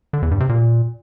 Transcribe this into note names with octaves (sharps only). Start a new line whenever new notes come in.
D3
E2
G2
C3
A#2